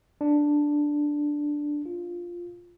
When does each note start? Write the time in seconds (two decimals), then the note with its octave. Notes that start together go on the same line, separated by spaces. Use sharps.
0.21 D4
1.86 F4